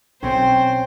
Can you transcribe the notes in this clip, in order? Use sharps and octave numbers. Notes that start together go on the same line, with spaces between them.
B1 C4 C#4 C5 G5